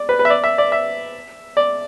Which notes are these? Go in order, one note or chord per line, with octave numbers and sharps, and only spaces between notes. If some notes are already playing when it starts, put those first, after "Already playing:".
Already playing: D5
B4
B4
E5
D5
E5
D5
E5
D5